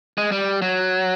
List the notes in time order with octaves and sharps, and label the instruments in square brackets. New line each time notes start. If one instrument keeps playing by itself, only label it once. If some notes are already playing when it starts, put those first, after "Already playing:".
[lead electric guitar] G#3
G3
F#3